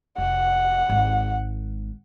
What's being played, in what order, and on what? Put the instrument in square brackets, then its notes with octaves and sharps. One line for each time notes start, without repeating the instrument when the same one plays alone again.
[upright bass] F1 [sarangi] F#5
[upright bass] G#1 G#3